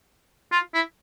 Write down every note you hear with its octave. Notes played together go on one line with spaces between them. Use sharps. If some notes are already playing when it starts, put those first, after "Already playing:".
F4
E4